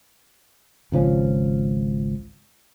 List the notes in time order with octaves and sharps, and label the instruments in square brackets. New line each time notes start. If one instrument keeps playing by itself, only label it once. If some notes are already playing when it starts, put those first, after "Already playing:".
[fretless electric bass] G#1 C#2 F3 C#4